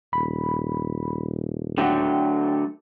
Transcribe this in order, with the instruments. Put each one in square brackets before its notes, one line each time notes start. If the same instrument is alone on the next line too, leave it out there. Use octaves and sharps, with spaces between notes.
[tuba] D#1 [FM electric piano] B5
[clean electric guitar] D3 F#3 A3 [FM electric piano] F#5 G5